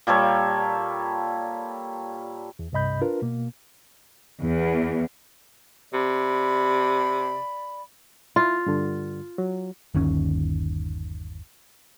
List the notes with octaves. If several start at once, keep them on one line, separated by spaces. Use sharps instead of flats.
A#2 G3 A4 C#5
E2
C2 G2 C3 D#5 B5 G6
D4 F4 A#4 B4
B2 A#3
E2
C3 D5 B5
E4 F4
G2 D3
F#3
G1 D#2 D#3 C#4